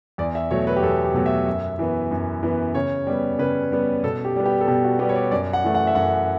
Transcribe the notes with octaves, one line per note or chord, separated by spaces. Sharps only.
E2 D5
E5
B2 F#3 A3 C#5
B4
G4
E2 A4
G4
B2 F#3 A3
E5
F#2
E3 B3
F#2
E3 B3
C#3 C#5
G3 B3
C#3 B4
G3 B3
B2 A4
G4
G3 B3
G4
A4
B2 G4
F#4
G3 B3 G4
C#5
D5
F#2 D5
F#5
E3 A3
F#5
E5
F#2 F#5